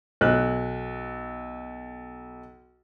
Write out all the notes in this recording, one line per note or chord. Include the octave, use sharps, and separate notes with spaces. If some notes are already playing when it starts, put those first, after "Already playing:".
B1 F#6